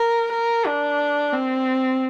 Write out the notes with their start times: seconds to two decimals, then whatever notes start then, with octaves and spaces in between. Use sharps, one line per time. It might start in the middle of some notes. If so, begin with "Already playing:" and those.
Already playing: A#4
0.32 A#4
0.66 D4
1.32 C4